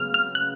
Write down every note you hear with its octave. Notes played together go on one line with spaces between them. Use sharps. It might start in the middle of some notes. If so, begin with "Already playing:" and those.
Already playing: C#3 F#3 B3 F6
F6
F#6